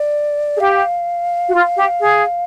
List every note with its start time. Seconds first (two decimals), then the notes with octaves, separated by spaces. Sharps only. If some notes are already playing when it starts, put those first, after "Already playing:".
Already playing: D5
0.56 G#4
0.60 G4 F5
1.48 F#4
1.54 F4
1.77 G4
2.01 G#4